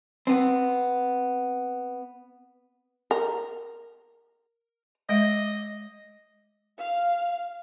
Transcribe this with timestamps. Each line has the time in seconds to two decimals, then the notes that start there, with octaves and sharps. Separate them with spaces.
0.27 B3 C4
3.11 A#4
5.09 G#3 D#5 E5
6.78 F5